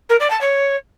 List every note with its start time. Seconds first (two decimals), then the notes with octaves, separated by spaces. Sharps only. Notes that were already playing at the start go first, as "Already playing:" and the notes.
0.09 A#4
0.19 D5
0.30 A5
0.40 C#5